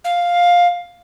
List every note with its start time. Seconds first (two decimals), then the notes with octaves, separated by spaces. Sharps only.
0.04 F5